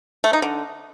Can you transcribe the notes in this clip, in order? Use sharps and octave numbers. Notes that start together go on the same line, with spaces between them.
A3
D#4
D3